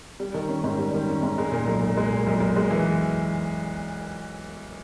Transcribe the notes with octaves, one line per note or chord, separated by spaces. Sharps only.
G3
D#3
C#4
G#2
G3
D#3
C#4
G#2
G#3
A#2
B1
B1
G#3
A#2
B1
B1
G#3
E3